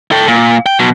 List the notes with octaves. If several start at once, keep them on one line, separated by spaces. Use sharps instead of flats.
A4 G5
A#2
G5
B2 F#3